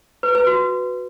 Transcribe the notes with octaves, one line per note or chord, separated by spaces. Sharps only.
B4
B4
F#4